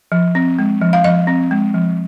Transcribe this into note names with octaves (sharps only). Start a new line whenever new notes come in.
F3
C4
G#3
F3
F5
F3 D#5
C4
G#3
F3